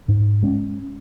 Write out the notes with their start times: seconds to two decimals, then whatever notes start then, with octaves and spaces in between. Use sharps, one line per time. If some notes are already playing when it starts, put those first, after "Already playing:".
0.08 G#2
0.42 G#3 C#4